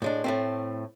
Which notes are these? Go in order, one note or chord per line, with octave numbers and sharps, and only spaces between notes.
A2 G#3 D4
A2 A3 C4